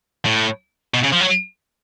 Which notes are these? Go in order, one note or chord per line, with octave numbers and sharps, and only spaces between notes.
A2
B2
C#3
F3
F#3